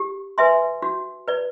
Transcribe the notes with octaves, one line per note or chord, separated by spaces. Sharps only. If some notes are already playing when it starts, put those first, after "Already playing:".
Already playing: G4
B4 E5 G#5 C6
F#4
B4 D5